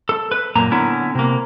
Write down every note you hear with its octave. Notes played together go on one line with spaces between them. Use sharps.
A4
B4
F#2 A#2 A#3 A#5
D3 B3 C#4 E4
C3 A#3